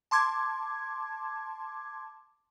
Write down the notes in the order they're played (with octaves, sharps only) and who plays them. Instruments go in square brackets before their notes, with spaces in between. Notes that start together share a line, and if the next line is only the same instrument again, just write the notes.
[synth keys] A5 C6 D6 G#6